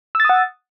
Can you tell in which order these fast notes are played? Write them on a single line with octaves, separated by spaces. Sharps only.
E6 A6 D#6 F#5